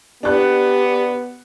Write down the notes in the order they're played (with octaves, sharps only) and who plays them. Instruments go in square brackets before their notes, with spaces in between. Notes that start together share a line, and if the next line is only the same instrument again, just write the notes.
[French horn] B3 [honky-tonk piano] D4 F#6 [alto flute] G4